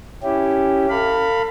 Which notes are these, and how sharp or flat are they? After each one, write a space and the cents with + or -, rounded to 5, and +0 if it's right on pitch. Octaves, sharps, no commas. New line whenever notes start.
C#4 +0 E4 +0 G4 +0
A4 +45 F5 +0 B5 +5